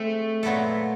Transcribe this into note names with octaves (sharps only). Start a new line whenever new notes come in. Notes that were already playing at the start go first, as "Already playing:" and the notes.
Already playing: G#3 A3 C4
A#2 F#3 B3 E4 A4